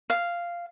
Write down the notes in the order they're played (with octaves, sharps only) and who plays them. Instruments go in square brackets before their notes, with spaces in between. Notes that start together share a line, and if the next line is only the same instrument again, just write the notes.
[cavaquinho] F5